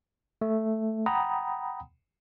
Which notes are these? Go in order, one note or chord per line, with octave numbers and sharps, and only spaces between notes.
A3
F#5 G5 A#5 B5 D#6